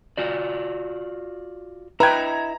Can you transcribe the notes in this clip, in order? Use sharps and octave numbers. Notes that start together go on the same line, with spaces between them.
F4 F#4 D5
E4 B4 D#5 E5 G5 A#5 G#6